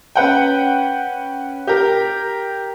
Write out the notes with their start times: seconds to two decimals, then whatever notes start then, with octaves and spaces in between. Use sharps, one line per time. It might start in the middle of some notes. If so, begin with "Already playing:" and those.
0.16 C#4 B4 F#5 G5
1.67 G4 A#4